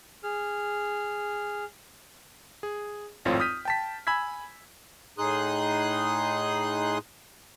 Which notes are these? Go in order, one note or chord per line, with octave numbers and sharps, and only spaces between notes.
G#4 F6
G#4
G#1 F2 A2 C4 F4 C#5
D#6 F6 G6 B6 D#7
G5 A5 B6
G#5 B5 E6 G#6 B6
A2 D#4 G#4 C6 D#6 F#6